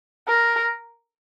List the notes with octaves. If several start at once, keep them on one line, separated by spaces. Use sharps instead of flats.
A#4